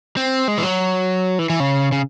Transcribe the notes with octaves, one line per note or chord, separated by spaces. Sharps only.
C4
G#3
E3
F#3
E3
E3
C#3
C#3